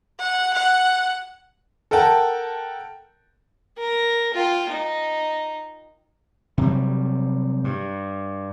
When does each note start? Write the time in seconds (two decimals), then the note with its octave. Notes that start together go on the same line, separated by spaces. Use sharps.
0.19 F#5
0.54 F#5
1.91 A4 A#4 F#5 G5 A5
3.78 A#4
4.34 F4 G5
4.70 D#4
6.58 C3 F#3 G3
7.64 G2